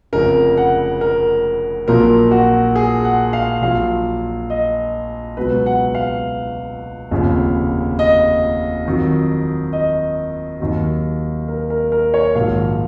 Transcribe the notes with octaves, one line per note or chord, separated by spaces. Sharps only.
F1 F2 C#3 A#4
F#5
A#4
A#1 A#2 F#3 A#4
F#4
G#4
F#5
F5
A#1 A#2 F#3 F5
D#5
C#2 B2 F#3 B4
F#5
F5
F1 D#2 C#3 F3
D#5
F2 D#3 F#3
D#5
D#2 D#3 F#3
A#4
A#4
A#4
C#5
A#1 G#2 D#3 F#3 F5